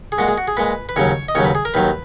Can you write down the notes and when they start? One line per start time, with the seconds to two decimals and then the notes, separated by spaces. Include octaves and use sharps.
0.12 G#4
0.18 A#2 G#3 F#4
0.28 G#4
0.38 F#4
0.48 G#4
0.57 A#2 G#3 B4
0.89 B4
0.96 D#2 C#3 F#3 C#5
1.28 D#5
1.35 D#2 C#3 F#3 C#5
1.45 B4
1.55 G#4
1.65 A#4
1.74 D#2 D#3 F#3 B4